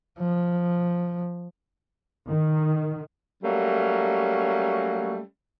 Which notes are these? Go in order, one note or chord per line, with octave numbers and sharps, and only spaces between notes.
F3
D#3
F#3 G3 A3 A#3 C#4